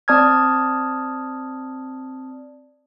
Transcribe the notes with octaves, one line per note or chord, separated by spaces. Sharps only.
C4 D5 A5 D#6 F6 G#6